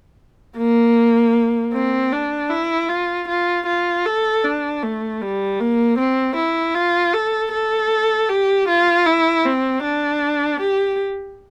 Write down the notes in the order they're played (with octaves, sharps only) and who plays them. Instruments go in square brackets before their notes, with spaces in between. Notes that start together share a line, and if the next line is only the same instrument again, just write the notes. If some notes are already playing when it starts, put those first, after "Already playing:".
[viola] A#3
C4
D4
E4
F4
F4
F4
A4
D4
A3
G3
A#3
C4
E4
F4
A4
A4
G4
F4
E4
C4
D4
G4